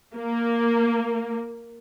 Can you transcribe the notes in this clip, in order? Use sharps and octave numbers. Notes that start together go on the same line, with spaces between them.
A#3